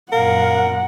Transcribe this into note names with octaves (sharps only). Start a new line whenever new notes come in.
F#2 A#2 A#4 F5 F#5